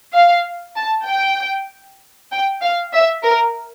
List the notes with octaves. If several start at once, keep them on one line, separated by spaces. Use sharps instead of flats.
F5
A5
G5
G5
F5
E5
A#4